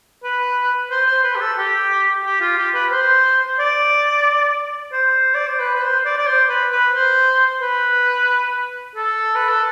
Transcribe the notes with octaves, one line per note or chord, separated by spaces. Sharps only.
B4
C5
C5
B4
G4
A4
G4
G4
F4
G4
B4
C5
D5
C5
D5
C5
B4
B4
C5
D5
D5
C5
B4
B4
C5
B4
A4
B4
A4